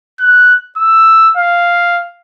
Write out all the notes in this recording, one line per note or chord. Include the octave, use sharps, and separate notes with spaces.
F#6
E6
F5